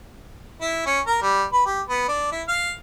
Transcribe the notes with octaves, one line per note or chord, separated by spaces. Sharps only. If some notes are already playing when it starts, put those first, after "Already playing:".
E4
C#4
A#4
G3
B4
G4
B3
D4
E4
F5